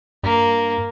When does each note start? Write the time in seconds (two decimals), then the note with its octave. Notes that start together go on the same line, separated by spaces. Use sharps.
0.23 G2 A#3